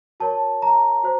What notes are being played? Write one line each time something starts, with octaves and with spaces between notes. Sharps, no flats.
F#4 A#4 C#5 A5
A#5
F#4 C5